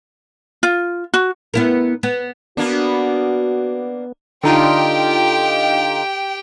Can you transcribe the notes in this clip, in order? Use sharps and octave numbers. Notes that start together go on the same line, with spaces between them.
F4
F#4
B3 E4 A#4
B3
A#3 B3 D4 F#4
D3 D#4 F4 G4 G5